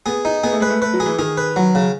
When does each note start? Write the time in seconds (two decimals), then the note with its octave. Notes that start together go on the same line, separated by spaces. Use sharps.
0.06 B3 G#4
0.25 D#4
0.44 B3 G#4
0.52 A3
0.60 G#3 B4
0.70 A3
0.81 A3 B4
0.93 F#3
1.00 G#4
1.06 E3
1.19 D#3 G#4
1.37 B4
1.56 F#3
1.75 C#3